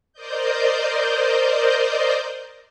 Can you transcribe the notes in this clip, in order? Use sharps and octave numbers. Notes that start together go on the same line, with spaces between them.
A#4 C5 D5 D#5 G6